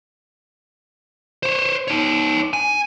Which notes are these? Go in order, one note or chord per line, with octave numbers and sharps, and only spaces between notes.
C5 C#5
D#4 C#5
G#5